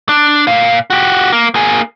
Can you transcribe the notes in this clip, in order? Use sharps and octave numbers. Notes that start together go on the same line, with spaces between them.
D4
A#2 F5
F#4 G4
A#3
A#3 G#4